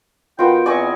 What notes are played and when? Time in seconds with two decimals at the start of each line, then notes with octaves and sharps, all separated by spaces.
0.39 D#3 B3 F4 F#4 G5
0.66 E2 C4 D5 D#5 G#5 C#6